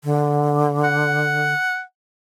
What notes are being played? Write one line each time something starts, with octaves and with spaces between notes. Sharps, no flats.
D3
F#5